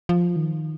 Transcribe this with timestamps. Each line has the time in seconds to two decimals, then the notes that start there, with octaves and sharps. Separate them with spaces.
0.09 F3
0.36 D#3